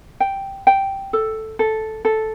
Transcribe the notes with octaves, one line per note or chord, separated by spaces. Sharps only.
G5
G5
A4
A4
A4